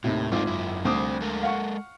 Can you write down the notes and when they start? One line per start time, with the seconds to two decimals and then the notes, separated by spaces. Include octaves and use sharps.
0.04 D#2 A2 C3
0.32 G#1 A3 C4 D4 F4 D6
0.47 F#2 E4
0.85 D2 G3 C4 C5 D6 D#6
1.21 G#3 A4 A#4
1.43 F5 F#5 C#6